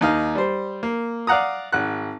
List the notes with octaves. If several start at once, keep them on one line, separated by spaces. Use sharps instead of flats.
D#2 D#4 F5
G3 C5
A#3
D5 F5 F#5 A#5 D#6
G#1 F#5 F#6